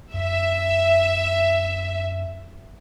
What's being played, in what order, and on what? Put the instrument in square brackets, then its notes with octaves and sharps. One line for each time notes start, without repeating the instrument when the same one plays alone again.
[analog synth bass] F#2 [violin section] E5